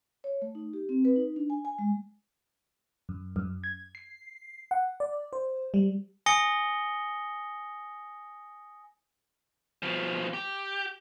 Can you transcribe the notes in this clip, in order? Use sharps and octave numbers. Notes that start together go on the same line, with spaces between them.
C#5
A3
D#4
G4
C4
B4
D#4
D4
G#5
G#5
G#3
F#2
F#2
G#6
C7
F#5
D5
C5
G3
G#5 D#6 A#6 C#7 G7
B2 F3
G4